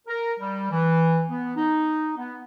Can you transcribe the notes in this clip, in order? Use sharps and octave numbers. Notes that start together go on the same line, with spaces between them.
A#4
G3
E3
B3
D#4
B3